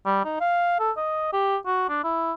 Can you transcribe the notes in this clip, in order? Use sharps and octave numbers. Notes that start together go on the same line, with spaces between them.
G3
D#4
F5
A4
D#5
G4
F#4
D4
E4